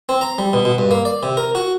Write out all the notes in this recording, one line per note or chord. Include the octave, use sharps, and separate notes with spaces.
C4
A#5
G3
B2
B2
G2
A#3
D5
C3
A#4
F#4